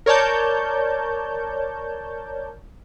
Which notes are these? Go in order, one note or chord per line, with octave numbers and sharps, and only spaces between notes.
A#4 C#5 D5 A5 G6